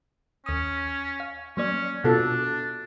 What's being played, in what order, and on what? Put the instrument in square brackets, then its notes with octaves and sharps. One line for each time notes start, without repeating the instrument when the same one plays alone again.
[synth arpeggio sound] D#2 D#6 [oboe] C#4
[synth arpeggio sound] F5
[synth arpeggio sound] F#3 A#3 D5 [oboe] C#4
[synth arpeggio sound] B2 B3 F4 [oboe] D4 [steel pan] F#4 A4